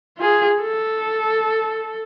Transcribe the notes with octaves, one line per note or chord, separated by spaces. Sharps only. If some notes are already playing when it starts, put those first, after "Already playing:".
F4 G#4
A4